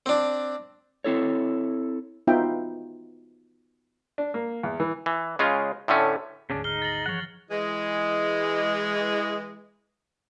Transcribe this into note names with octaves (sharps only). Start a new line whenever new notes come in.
C4 D4
C4 E4 A4 C#5
B3 D#4 F4 E5 G5
D4
A#3
E2
E3
E3
C#3 G#3 C#4 F4
A2 D3 A3 C#4
G#1 D2 C#3 C#4 D4 G#4
D#4 F6 C7 G7
A6 A#6 F#7
G1 E3 F3 C#5 F#5
E3 G#3